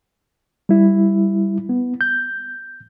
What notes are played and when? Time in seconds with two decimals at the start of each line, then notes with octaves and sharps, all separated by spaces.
0.69 G3 E4
1.69 B3
2.01 G6